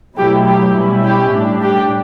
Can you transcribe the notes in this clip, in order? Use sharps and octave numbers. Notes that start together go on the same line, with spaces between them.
B2 F#3 A3 E4 G4
G4
B2 G3 C#4 E4
G4
A2 G3 D4
G4